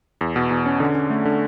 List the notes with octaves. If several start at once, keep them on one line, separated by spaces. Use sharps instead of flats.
E2
B2
E2
C#4
D3
C#4
A3
D3